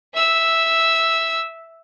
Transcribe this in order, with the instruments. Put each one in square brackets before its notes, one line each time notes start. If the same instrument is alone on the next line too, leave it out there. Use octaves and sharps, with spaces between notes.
[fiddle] E5 E6